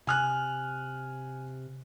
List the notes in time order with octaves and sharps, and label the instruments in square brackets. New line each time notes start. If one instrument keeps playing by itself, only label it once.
[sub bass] C3 [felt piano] G#5 F6 F#6